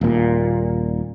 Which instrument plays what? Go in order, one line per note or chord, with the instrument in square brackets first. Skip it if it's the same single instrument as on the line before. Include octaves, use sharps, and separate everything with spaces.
[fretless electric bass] D#1 A#2